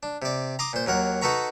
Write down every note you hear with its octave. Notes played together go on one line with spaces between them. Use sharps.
D4
C3 D5
A#5 C6 D6 D#6
A#2 C5
D#2 F#3 A#4 F#5
D#4 F#4 A4 B4 A#5 C#6